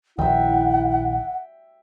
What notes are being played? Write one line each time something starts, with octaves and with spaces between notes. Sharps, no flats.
A#1 D#3 E4 E5 F#5 G5